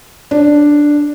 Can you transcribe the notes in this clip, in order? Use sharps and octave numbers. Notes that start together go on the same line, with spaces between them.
D4